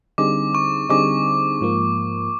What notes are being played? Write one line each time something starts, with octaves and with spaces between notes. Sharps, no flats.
D3 G3 C4 D#4 G#4 D6
C#6
D3 G3 C4 D#4 G#4 D6
G#2 F3 A#3